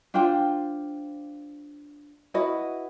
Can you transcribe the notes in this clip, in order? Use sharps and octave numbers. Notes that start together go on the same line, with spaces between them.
D4 F4 C5 G5
E4 F#4 B4 D#5